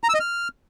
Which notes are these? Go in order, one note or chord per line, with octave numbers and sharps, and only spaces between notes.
A#5
E6
D#5
F6